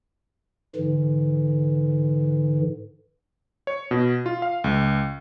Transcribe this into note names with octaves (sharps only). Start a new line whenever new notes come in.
G#2 D3 E3
C#5
B2
F4
F5
C#2